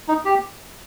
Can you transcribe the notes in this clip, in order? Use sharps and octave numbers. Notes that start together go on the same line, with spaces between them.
D#4
G4